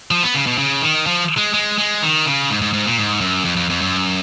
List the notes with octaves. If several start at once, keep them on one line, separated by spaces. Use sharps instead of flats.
F3
B3
C#3
B2
C#3
D#3
F3
G#3
G#3
G#3
D#3
C#3
G#2
G#2
G#2
A#2
G#2
F#2
F2
F2
F2
F#2